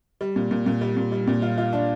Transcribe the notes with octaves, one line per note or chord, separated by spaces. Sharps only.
G3
A#2
A#2
A#2
G3
A#2
G3
A#2
F4
F4
D4